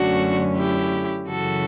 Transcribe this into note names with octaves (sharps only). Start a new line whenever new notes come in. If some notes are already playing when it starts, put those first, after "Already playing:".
Already playing: F#2 D3 A3 C#4 D4 F#4
E4 G4
F#2 C#3 E3 F#4 A4